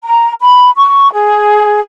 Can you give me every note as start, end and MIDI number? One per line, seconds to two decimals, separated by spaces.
0.04 0.32 82
0.40 0.70 83
0.76 1.11 85
1.11 1.79 68